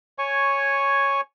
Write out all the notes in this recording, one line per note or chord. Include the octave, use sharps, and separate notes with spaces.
C#5 G#5 C#6